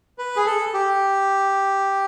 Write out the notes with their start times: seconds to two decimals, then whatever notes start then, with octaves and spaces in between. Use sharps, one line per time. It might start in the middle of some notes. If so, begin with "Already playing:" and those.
0.18 B4
0.36 G#4
0.46 A4
0.74 G4